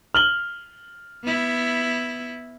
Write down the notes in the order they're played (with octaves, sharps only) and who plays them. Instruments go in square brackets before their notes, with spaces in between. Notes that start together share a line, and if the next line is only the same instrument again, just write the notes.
[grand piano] F6 F#7 G7
[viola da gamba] B3 E4